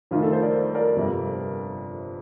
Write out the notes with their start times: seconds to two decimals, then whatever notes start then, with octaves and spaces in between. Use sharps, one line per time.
0.11 F2 D#3 A3 F4
0.22 F4 A4
0.32 A4 C5
0.42 A#4 D5
0.75 A#4 D5
0.96 G1 F2 C3 G3